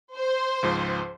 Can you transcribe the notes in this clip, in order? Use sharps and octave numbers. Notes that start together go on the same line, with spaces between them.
C5
C#2 G#2 F3